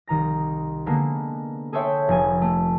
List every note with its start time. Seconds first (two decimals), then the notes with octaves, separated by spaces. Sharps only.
0.07 C2 D#3 A#5 A#6
0.86 D3 G#3 A#3 B3
1.73 G#4 A4 C5 C#5 E5 G5
2.08 F1 G#5
2.42 A3